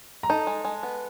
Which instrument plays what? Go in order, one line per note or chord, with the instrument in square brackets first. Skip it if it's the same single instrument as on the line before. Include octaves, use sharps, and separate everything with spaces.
[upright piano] A#5
[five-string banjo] D#4 [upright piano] A4 A5
[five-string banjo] G#3
G#3
B3